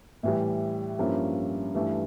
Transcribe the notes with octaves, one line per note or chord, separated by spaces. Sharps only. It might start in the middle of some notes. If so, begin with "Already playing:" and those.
A2 E3 G3
G2 F3 A#3 C#4 E4
G2 E3 A3